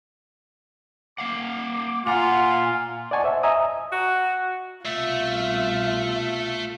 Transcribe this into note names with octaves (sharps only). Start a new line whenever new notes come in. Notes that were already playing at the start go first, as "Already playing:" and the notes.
A#3 F5 F#5 D6
A#2 F4 F#5 G#5 A#5
D5 D#5 F#5 G#5 A5 C#6
C5 E5
D#5 E5 G#5 A#5 D#6
F#4
C2 B2 A3 F4 E5